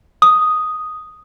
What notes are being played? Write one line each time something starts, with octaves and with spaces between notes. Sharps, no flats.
D#6